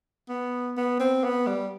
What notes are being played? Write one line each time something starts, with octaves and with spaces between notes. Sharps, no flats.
B3
B3
C4
B3
G3